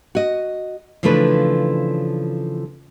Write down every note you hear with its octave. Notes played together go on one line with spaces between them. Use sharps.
F#4 D#5
C#3 E3 F3 A3 D4 B4